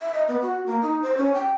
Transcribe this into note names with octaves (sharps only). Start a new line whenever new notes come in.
E5
D#5
B3
F#4
A#3
D#4
C5
C#4
G5